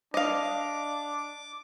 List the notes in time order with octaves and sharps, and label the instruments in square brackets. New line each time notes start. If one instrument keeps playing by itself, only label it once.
[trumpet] D4 [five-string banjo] D#5 F5 [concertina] D6